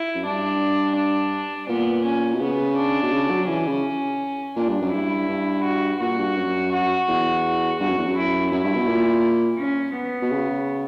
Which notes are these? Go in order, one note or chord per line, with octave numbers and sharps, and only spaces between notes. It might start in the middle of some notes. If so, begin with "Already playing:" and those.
Already playing: E4
F#2
G2 D4
D4
A#2 B3
C#4
B2
C#3 B3
D4
B2
C#3
F#3
E3 C#4
C#3
A#2 D4
G2
F#2
G2 E4
G2
F#4
A#2 F#4
G2
F#2
F#4
E2
G2 F#4
F#2
E2
F#2
E4
F#2 E4
G2
B2
A#2
C#4
B3
B2
C#3